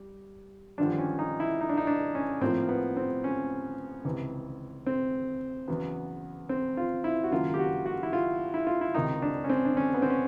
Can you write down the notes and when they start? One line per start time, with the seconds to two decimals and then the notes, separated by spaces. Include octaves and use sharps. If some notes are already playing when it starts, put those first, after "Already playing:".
Already playing: G3
0.78 G#1 G2 D3 F3 D4
0.98 C#4
1.19 D#4
1.40 E4
1.61 D#4
1.69 D4
1.77 D#4
1.87 D4
2.15 C#4
2.41 A2 F3 A#3 C4
2.69 B3
2.97 C4
3.24 C#4
4.05 C#2 C3 E3
4.87 C4
5.68 E2 C#3 F#3 B3
6.49 C4
6.77 F4
7.04 E4
7.24 F#4
7.31 G#1 F#2 C#3 F#3 A#3 F4
7.54 G4
7.59 F#4
7.86 F#4
8.03 E4
8.13 F4
8.54 E4
8.67 F4
8.81 E4
8.94 C#2 C3 D#3 D#4
9.22 D4
9.44 C#4
9.50 C4
9.65 D4
9.77 C#4
9.94 B3
10.02 C4
10.10 C#4